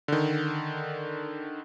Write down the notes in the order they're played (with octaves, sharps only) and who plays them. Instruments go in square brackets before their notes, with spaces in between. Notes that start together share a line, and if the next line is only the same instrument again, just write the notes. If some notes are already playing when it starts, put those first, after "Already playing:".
[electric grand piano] D3 D#3